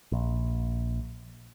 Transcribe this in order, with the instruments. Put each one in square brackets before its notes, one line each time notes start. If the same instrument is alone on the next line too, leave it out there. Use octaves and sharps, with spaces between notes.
[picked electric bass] A#1